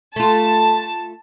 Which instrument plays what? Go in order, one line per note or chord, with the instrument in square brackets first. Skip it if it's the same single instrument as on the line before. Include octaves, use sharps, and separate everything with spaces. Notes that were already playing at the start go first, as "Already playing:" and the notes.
[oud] A3 F4 [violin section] A5